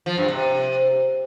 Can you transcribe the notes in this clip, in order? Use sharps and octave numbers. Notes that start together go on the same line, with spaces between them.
F3
G2
C3